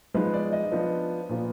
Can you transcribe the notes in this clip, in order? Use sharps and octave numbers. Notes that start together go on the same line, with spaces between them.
F3 G#3 B3 D#4 B4
D5
D#5
F3 B3 D4
A#2 F3 B3